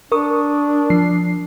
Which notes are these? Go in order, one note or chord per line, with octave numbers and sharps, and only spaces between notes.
D4 A#4 C#6 D#6
F3 C7